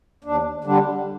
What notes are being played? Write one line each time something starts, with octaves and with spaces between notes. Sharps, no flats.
D#2 D4
D3 G3 D4